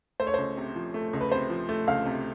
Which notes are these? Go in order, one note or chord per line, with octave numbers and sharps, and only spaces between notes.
A3 C5
C#5
C#2 C5
C3
F3
A3
C#2
B4
C3 C5
F3
A3
C#2 F5
C3